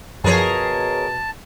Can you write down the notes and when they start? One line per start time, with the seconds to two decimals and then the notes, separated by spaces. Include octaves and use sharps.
0.24 F#2 B2 F3 G#4 A#4 C#5 A5